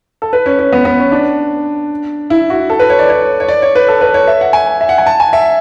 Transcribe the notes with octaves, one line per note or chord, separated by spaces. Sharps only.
A4
B4
C#4
C#4
B3
B3
C#4
D4
E4
F#4
A4
B4
C#5
D5
C#5
C#5
D5
C#5
B4
A4
B4
C#5
E5
F#5
G#5
E5
F#5
G#5
A5
G#5
E5